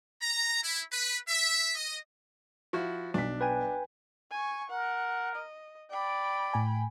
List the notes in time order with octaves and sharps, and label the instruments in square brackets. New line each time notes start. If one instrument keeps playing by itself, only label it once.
[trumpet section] A#5
E4
B4
E5
D#5
[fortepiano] F3 E4 F#4
[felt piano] B1 B6 [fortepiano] D4
[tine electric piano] B4 G5 G#5
[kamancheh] G#5 C#6
[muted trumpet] A#4 [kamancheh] F#5
[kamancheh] D#5
[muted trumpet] D5 [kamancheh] G5 B5
[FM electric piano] A2 G#5